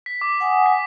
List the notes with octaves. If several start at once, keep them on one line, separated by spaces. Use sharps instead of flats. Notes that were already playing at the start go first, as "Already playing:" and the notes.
B6
D6
F#5 G#5 D#6
B6